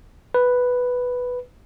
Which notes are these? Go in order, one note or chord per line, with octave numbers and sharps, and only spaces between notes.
B4